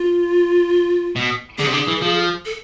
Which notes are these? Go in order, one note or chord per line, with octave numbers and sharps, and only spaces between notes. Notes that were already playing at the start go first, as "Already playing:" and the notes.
Already playing: F4
B2
D3 G#4
C3
D3
E3
F3
A4